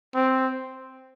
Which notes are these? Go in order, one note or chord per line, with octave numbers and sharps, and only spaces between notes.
C4